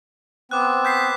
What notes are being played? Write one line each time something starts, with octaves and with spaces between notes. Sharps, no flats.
B3 C4 D6 F#6
G6 B6 C7